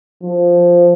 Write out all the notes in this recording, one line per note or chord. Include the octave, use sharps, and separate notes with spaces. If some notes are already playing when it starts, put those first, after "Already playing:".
F3